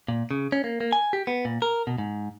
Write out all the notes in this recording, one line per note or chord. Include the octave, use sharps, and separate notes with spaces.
A#2
C#3
C#4
A#3
A#3
G#5
G4
B3
A#2
A#4
B2
G#2